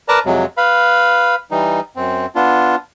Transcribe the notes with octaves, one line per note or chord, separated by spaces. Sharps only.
A#4 B4 D5 A5 A#5
F2 C3 F#3 G#3
B4 F5 B5
E3 G3 D#4
F#2 C4
B3 D4 F4